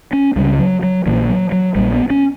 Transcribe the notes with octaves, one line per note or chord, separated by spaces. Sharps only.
C#4
C#2 C#3 G3
F#3
F#3
A#1 A#2 E3
F#3
F#3
A#1 A#2 G3
B3
C#4